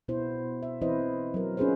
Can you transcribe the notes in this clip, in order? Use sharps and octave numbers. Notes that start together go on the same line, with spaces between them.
B2 B3 E4 C5
E5
E3 C4 E4 B4 C5 D#5
F#3 A#4
C#4 D#4 F4 G#4 B4 C5